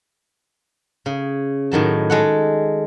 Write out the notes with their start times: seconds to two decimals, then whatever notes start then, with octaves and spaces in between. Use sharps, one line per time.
1.06 C#3
1.72 A2 D#3 F#3 A5
2.10 G#3 A4 F#5